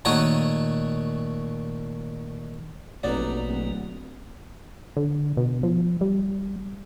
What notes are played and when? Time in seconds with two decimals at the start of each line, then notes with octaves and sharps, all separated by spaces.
0.05 A#2 D#3 A3 F#4 C#5 D#6
3.03 F1 A#1 B2 F#3 A#3 B3 D#4 D5
3.47 D1
4.97 D3
5.37 B2
5.63 F3
6.01 G3